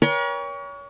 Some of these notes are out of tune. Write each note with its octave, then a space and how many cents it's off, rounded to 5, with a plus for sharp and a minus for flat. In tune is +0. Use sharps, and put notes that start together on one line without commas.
A#4 +45 C#5 +30 G5 +30